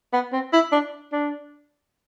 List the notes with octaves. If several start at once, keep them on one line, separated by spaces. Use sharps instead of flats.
B3
C4
E4
D4
D4